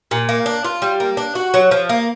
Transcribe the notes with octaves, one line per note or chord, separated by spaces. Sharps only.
A#2
A#3
D4
F4
G3
A#3
D4
F#4
F#3
F3
A#3